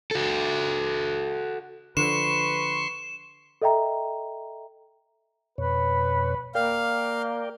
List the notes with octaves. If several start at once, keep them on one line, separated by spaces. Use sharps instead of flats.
F#4 A4
D3 F3 B4 C6 C#6 E7
A4 D#5 E5 G5 A#5
F2 B2 B4 C#5
A#3 A#4 D5 F5 G5